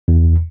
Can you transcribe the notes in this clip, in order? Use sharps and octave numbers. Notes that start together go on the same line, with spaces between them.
E2